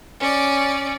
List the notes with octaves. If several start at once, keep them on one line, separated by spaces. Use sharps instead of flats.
C#4 D5